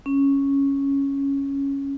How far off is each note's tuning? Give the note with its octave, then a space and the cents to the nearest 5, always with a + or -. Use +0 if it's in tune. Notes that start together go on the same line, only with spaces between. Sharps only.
C#4 -5